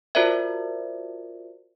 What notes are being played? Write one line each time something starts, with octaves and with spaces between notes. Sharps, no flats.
F4 F#4 A#4 C5 D5 E5